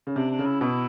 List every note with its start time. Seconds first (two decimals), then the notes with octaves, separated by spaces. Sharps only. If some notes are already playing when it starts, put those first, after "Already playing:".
0.07 C#3
0.16 C3 D4
0.31 D4
0.39 C#3
0.46 E4
0.61 B2 E4